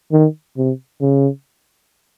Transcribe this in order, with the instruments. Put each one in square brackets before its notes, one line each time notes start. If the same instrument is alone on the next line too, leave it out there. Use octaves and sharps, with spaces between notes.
[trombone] D#3
C3
C#3